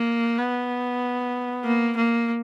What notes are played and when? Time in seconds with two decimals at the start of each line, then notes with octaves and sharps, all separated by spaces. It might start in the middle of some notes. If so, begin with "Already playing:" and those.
Already playing: A#3
0.37 B3
1.64 A#3
1.97 A#3